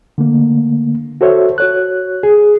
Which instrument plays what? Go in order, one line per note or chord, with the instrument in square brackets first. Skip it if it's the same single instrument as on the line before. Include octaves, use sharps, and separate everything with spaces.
[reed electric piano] D3 A3 A#3
F#4 A4 C5 C#5 E5
F#4 C#5 F#6
G#4